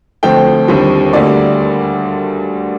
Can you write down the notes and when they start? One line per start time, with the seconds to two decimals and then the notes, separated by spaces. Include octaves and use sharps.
0.23 D2 D3 F3 A3 C4 G5
0.68 D#2 D3 G3 C4
1.13 D2 D3 G3 A#3 D5